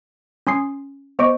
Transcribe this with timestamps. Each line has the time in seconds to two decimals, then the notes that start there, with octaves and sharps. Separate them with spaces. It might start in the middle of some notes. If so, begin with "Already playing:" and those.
0.47 C#4 G#5 C6 D#6 C7
1.19 B3 C5 D#5 C#6 D6 D7